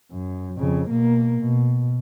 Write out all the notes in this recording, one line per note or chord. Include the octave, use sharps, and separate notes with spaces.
F#2
F2 C#3
B2 A#3
B2